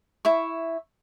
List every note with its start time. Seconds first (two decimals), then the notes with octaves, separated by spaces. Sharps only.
0.25 E4 E5 C#6